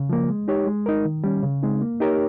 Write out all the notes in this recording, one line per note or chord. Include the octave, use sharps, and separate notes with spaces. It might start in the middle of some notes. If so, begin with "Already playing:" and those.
Already playing: C#3
F3 A#3
G#3
D#4 G4 C#5
G#3
D#4 A#4
D#3
G3 C#4
C#3
G#3 C4 D#4
A#3
D#4 G4 A#4 C#5